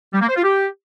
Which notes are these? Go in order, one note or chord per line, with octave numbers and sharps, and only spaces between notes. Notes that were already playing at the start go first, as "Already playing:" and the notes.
G3
A#3
C5
F4
G4